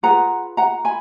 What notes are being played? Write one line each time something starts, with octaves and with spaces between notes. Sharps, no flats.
F4 G#4 B4 F#5 A#5
F#5 A#5
G#5 B5